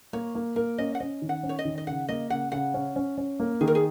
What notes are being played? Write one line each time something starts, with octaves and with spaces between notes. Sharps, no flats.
A#3 C#5
A#3
A#3 A#4
C#4 D#5
F#5
C#4 D#5
D#3
F#5
C#4
C#5
D#5
D#3
D#5
C#3 F#5
A#3 D#5
C#3 F#5
C#3 F#5
C#4
C#4
C#4
A#3
D#3 G#4
A#4
G#4